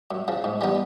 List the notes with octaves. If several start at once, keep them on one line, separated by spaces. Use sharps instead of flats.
F#2
C#3 F3
G#2
E3 G3 B3 D#4